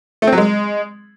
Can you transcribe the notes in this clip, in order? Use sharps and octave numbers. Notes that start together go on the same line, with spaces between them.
A3
C4
F#3
G#3